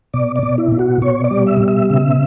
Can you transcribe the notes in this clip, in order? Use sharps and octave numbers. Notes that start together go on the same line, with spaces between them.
B2 D5
D5
B2
E4
B2
F#4
B2 C#5
D5
G3
E5
B2
E5
C#3 E5